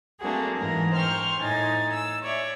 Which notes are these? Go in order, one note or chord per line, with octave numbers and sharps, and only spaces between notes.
A3 A#3 C4 D4 F#4 G#4
G#2 E3 A#4
C5 G5 C6 C#6 F6
A2 D#4 G#5 A6
E6
C#5 D5 E5